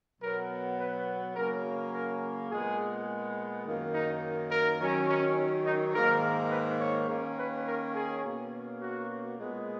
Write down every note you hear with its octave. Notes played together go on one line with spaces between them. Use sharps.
B2 F#3 B3 A#4
B4
C#3 F#3 A#3 C#4 A#4
A#4
A#2 G#3 B3 G#4
F#2 D#3 A#3
D#4
A#4
D#3 F#3 C#4
C#4
D#4
G#2 D#3 A#3 A#4
B4
C#5
D#3 A#3 C#4
B4
A#4
G#4
B2 A#3 C#4
F#4
A#2 G#3 B3